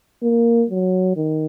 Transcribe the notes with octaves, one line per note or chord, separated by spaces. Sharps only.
A#3
F#3
D#3